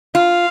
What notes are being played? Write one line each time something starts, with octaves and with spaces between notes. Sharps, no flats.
F4 F5